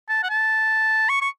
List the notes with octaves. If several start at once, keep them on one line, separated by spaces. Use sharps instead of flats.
A5
F#5
A5
C#6
C#6